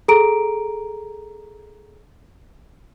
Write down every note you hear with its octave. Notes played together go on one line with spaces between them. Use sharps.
G#4 A4 A#5 D7